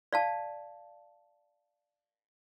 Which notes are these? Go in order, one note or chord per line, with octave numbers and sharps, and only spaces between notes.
D5 F5 A5